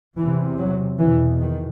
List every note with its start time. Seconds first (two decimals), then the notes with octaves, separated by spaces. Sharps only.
0.18 E2 C3 E3
0.58 F#3
1.00 E2 B2 E3
1.41 D#3